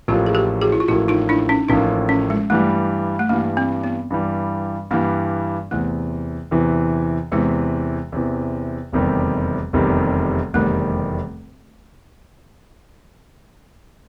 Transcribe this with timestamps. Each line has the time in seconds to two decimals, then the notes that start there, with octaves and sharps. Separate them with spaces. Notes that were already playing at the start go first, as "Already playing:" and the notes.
0.08 A1 A2 F3 A#3 F4 G4
0.26 G#4
0.35 G4 A4
0.61 F#4 G#4
0.72 E4
0.80 F4
0.88 A1 A2 F3 A#3 E4 F#4
1.08 D#4 F4
1.29 D4 E4
1.49 C#4 D#4
1.69 A1 A2 F3 A#3 C#4 D#4
2.09 C#4
2.30 G#3
2.50 G2 E3 G3 A3
3.19 A3
3.29 G2 E3 G3 A#3
3.57 C4
3.84 B3
4.10 G2 E3 G3
4.91 G2 E3 G3 A#3
5.71 E2 C3 E3 A3
6.51 E2 C3 E3
7.32 E2 C3 E3 G#3
8.12 E2 C3 E3
8.92 F1 E2 C3 D#3 G3
9.73 F1 E2 C3 D#3 G3
10.54 F1 E2 C3 D#3 G3 A3